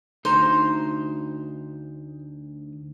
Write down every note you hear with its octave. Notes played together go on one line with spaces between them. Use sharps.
D2 D#4 C5 A#5